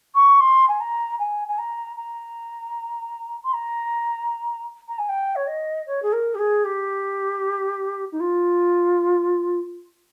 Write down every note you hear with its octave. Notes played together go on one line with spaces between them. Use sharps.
C#6
C6
G#5
A#5
G#5
G#5
A#5
A#5
C6
A#5
A#5
G#5
G5
C#5
D#5
C#5
G#4
A#4
G4
G#4
G4
D#4
F4